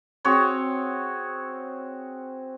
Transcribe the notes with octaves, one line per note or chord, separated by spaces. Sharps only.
C4 F#4 G#4 C#5